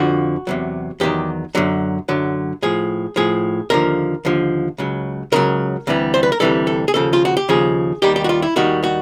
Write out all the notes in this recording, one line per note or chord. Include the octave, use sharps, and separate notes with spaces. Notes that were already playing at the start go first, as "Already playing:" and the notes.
Already playing: F2 D3 F3 F#4
E2 C3 D#3 F#3
E2 C3 D#3 F#3 G4
F#2 D3 F#3
F#2 D3 F#3
A2 F3 G#4
A2 F3 G#4
D#2 D3 F3 A#4
D#2 D3 F3
C#2 C#3 F#3
C#2 C#3 F#3 A#4
D2 C3 E3 G3
C5
B4
A#4
D2 C3 E3 G3 A4
A4
G#4
D#2 C#3 F3 A4
F4
F#4
G4
D#2 C#3 F3 G#4
D#2 D#3 G3 G4
G4
F#4
F4
E4
D#2 D#3 G3 F#4
F#4